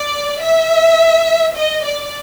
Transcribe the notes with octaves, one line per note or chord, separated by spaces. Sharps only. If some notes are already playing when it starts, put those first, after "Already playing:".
Already playing: D5
E5
D#5
D5